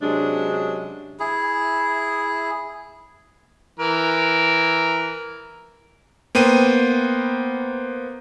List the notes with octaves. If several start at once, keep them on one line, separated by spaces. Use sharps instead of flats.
C3 F#3 G#3 C#4 D4
E4 G#4
E3 A#4
A#3 B3 C5 G5 D#7